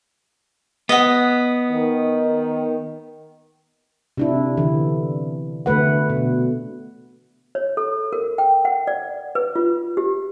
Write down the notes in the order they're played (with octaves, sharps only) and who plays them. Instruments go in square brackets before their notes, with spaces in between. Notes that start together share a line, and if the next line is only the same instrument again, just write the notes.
[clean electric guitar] B3 [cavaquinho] D#5 F#5
[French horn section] D#3
[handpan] C3 D4 E4
D3 E3
D3 A3 B4 F#5
B2
[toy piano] C#5
A4
A#4
G5
F#5
D5
B4
F4
G4